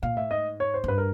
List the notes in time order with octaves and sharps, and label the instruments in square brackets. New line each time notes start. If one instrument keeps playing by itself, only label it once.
[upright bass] A#2 [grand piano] F5
[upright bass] A2 [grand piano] E5
[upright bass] G#2 [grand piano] D#5
[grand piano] C#5
C5
[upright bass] F#2
[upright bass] G2 [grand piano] B4
[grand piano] A#4